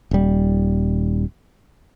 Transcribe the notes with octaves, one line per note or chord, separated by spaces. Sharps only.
D#1 G3